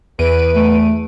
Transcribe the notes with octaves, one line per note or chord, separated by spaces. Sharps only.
E2 B4 D7 D#7
A3